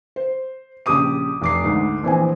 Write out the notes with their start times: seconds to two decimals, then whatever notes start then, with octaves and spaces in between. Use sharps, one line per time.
0.16 C5
0.86 A#1 C#3 G4 D6 D#6 D#7
1.41 F1 D6 C7
1.64 D2 G#2
2.03 A#1 E3 C4 G#5